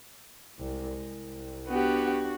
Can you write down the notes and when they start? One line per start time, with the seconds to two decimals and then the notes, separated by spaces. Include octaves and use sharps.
0.59 C2 G#3
0.99 C2
1.68 B3 D4 F#4 G4